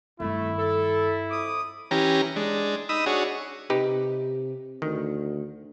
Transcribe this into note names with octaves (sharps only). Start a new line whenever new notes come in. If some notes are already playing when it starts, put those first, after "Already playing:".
G2 D#3 A3 E4
A4
F2 D6 D#6
E3 C#4 G4 A#5
G#3 D4
D#4 B5 D#6 E6
D4 F#4 G#4 C#5
C3 D#4 G4 B4
D2 D#3